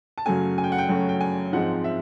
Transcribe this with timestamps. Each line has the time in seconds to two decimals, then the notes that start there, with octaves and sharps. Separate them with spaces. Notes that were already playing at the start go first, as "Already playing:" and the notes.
0.18 A5
0.26 F#2 C#3 F#3 A3 C#4 G#5
0.58 G#5
0.64 G5
0.72 F#5
0.78 G5
0.89 F#2 C#3 F#3 A3 C#4 F#5
1.09 G5
1.21 G#5
1.53 G#2 F3 G#3 C4 D#4 F#5
1.84 E5